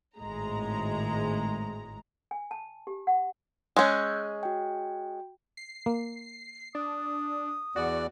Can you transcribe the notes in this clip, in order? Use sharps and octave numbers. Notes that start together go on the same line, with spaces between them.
G#1 A2 G#3 A#5
G#5
A5
G4
F#5
G#3 C#4 E6 F#6 G6
F#4 G5
C7
A#3
D4 D#6
E2 F#4 D5